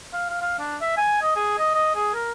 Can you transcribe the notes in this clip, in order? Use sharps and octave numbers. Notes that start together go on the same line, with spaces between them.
F5
F5
F5
D4
E5
G#5
D#5
G#4
D#5
D#5
G#4
A#4